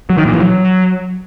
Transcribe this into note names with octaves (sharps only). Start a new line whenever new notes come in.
F#3
D#3
A#2
E3
F#3